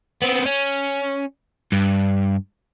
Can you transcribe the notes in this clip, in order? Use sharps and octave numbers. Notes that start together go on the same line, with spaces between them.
B3 C4
C#4
G2